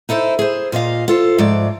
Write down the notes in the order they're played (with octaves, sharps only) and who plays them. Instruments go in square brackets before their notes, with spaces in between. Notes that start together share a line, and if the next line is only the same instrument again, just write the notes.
[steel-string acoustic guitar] D#4 E4 A4 C5
G#4 C5
A#2 F4 D#5 F5
F4 A4 C5
G#2 F3 A3 D5